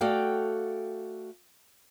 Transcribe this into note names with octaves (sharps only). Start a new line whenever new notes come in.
A3 F#4 A4 D5 F5 G5